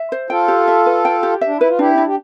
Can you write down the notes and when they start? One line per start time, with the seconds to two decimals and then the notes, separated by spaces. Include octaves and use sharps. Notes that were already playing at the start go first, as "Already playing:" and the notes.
Already playing: E5
0.12 C5
0.30 F4 A4 G5
0.48 G4
0.68 E5
0.86 B4
1.05 G5
1.23 G4
1.41 E5
1.47 D4
1.58 E4 B4
1.68 F4
1.79 D4 E4 G4
1.98 D4
2.07 G4